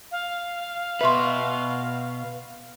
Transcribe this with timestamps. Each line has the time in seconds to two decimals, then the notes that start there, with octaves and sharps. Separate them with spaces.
0.12 F5
1.01 B2 B4 E5 C6